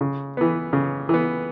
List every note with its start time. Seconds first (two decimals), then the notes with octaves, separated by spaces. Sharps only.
0.01 C#3
0.37 E3 B3
0.73 C#3
1.09 E3 B3